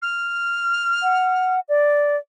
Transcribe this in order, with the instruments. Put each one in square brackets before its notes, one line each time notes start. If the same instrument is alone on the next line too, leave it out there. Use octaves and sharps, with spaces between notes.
[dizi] F6
[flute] F#5
D5